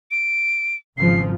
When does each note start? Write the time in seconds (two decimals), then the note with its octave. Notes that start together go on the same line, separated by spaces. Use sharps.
0.11 D7
0.98 G#1 C#3 F3 C7